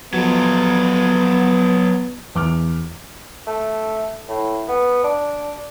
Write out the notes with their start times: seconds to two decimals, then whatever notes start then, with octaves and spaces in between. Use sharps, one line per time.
0.14 F3 F#3 B3 A4
2.35 E2 D6 F6
3.47 A3
4.28 A2
4.68 B3
5.04 D4